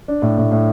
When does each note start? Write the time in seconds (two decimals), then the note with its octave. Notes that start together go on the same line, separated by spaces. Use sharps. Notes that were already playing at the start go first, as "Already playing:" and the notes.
0.08 D4
0.22 A2
0.38 A2
0.52 A2